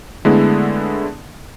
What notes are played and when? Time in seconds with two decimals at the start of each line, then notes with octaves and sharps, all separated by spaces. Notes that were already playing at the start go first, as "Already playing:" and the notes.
0.25 D3 G#3 A3 B3 E4